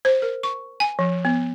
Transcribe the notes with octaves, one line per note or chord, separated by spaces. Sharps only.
C5
A#4
C#6
G#5
F3
B3